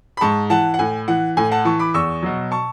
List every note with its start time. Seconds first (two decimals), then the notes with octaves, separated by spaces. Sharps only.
0.17 B5
0.21 G#2 A5 C#6
0.50 E3 F#5 A5
0.74 F#5
0.79 A2 G#5
1.08 E3 F#5
1.37 A2 G#5
1.51 F#5 A5
1.65 E3 A5 C#6
1.79 B5 D6
1.94 E2 C#6 E6
2.23 B2 F#3
2.51 A5 C#6